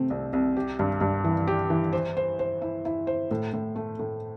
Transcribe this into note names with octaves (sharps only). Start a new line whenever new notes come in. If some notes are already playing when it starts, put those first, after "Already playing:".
Already playing: C3 A3 C4
C2
C2
G4
G2
G2
E3
G4
E3
C5
C5
C5
E4
E4
C5
A2
A2
A3
A2